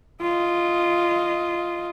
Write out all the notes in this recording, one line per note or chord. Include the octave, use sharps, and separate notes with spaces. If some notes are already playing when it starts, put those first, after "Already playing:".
F4 D#5